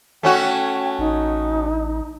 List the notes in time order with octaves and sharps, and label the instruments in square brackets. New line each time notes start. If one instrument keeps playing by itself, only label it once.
[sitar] A3 C#4 F#4 [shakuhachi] G5
[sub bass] A1 [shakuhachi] D#4